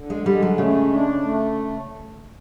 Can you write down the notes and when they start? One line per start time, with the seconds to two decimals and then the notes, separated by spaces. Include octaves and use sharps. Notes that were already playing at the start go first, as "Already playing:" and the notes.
Already playing: D3
0.10 G#3
0.26 G3 G#3
0.42 F#3
0.58 C#3 A3
0.90 D4
1.23 A3